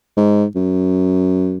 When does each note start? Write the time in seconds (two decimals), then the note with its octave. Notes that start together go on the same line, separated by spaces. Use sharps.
0.17 G#2
0.56 F#2